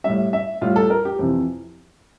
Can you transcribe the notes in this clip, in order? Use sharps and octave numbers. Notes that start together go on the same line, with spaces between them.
A2 G3 E5
E5
A2 G3 F4
A4
A#4
G4
F2 C3 E3